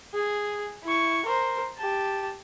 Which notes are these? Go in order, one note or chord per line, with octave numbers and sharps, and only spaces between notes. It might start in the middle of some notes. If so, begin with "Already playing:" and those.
G#4
E4 C#6
A#4 C5
G4 A5